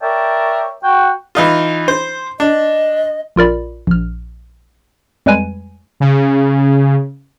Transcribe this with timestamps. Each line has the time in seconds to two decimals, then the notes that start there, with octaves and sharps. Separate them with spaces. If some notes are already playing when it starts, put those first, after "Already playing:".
0.02 A#4 C#5 D5 E5 G5 A5
0.84 F#4 G5
1.35 E3 D#4 F4
1.88 C5
2.40 D4 D#5
3.36 A#1 F4 A#4 D5 B5
3.87 A#1 F6
5.26 F2 G3 G#3 B4 G#5 D#7
6.00 C#3